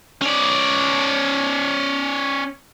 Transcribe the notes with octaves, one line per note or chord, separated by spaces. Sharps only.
C#4 D5